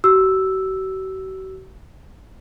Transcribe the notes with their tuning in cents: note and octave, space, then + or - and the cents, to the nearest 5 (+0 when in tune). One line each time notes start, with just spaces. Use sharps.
F#4 +45 E6 +0